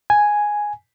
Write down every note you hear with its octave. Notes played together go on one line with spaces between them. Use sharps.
G#5